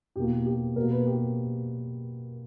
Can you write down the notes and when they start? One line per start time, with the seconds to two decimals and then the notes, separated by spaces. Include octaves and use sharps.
0.16 E2 B2 A#3 G4
0.46 G4
0.76 B2 A#3 A#4
0.91 B4
1.06 G4